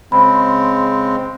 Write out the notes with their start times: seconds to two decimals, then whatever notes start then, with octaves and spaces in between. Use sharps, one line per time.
0.12 C#3 G#3 C4 B5